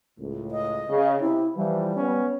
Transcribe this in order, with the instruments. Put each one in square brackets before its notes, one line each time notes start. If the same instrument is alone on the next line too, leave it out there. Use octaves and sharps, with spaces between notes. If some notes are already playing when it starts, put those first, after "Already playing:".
[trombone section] C#2 A2
[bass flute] D#5
[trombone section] C#3
[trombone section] C3 [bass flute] E4
[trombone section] E3 F3 [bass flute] G3
[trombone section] B3 C#4